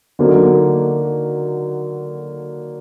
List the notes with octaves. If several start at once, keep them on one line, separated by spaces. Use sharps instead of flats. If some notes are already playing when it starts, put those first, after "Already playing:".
D3 F#3 A#3 D#4